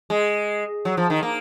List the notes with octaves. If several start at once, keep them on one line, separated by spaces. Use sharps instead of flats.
G#3
F#3
F3
D#3
A#3